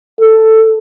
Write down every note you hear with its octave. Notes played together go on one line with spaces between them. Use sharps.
A4